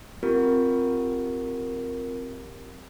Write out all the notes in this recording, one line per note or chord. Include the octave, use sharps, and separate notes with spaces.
C4 F4 G4 A#4